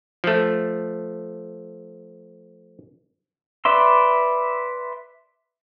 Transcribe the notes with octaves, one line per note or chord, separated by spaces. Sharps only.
F3 A3
B4 D5 E5 C6